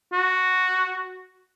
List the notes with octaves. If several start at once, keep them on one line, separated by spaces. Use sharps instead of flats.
F#4